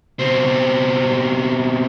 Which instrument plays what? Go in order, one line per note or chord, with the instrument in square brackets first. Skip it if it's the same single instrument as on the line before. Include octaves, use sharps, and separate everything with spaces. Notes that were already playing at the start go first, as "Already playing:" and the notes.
[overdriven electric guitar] B2 C4